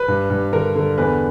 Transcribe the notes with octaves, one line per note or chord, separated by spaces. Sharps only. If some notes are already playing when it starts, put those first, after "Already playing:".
Already playing: B4
G2
G2
D3 A#4
D3
E2 B4